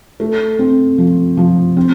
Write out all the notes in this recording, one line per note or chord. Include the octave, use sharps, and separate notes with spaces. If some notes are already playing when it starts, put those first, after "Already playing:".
A3
C4
F3
F3
C4